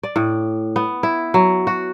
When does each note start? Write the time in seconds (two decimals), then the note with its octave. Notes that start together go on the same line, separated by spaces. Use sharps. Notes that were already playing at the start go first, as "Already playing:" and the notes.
0.03 D5
0.16 A2
0.76 B3
1.03 E4
1.34 F#3
1.67 F#4